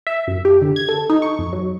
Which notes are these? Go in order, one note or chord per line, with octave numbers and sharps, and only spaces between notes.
E5
F#2
G4
D3
G#6
A4
D#4
C#6
F2
F#3